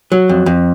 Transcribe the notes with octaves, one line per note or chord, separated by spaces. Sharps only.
F#3
F2
F2